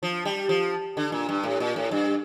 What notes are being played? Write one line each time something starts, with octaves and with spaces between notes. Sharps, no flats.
F3
G3
F3
D3
A#2
G2
A2
A#2
A2
G2